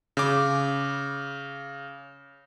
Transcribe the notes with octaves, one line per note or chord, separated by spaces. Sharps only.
C#3 D6